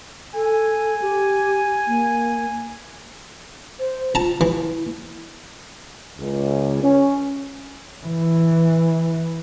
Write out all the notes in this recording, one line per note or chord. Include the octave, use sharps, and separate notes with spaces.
A4 G#5
G4
A#3
C5
F4 A5 A#5
E3 E4
C#2
C#4
E3